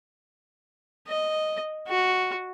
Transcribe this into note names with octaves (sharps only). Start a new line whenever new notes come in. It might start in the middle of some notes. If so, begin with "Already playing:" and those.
D#5
F#4